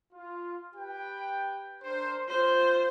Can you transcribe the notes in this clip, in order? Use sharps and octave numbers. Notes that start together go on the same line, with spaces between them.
F4
G4 B4 G5
D4 A#4 C5
F4 C5